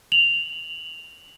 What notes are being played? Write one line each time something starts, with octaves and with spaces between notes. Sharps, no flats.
F7 F#7